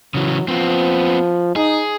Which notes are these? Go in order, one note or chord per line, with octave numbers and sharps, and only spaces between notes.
C#3 E3 F#3
F3 B3 C4
D#4 G#4